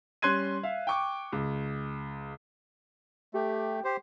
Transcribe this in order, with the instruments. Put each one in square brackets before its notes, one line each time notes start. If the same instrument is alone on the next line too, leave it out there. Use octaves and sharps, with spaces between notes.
[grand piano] G3 C#4 C6 F#6 G#6 D#7
E5 F5
G5 C#6 D6
C#2
[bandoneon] A3 [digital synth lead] G4
[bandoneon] G4 C5